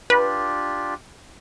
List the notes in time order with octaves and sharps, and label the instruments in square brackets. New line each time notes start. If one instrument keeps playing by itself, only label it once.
[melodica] D4 F4 G4 [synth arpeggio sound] B4